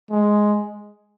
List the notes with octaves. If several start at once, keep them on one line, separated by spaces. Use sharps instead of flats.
G#3